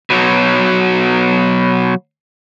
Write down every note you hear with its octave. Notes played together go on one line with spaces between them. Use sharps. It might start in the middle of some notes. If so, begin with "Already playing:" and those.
B2 F#3